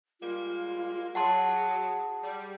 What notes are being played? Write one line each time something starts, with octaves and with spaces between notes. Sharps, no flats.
G3 G#3 A#3 F4
F#3 G#4 F#5 A5 C6
G3